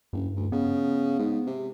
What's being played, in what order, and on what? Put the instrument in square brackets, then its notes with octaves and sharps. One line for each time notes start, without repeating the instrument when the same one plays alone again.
[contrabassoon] F#1 [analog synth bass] G2
[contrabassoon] D2
[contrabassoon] C#3 [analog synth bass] B3
[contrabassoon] G#2
C3